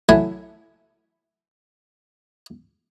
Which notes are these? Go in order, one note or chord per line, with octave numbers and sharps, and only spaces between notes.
F#3 A3 E4 G#5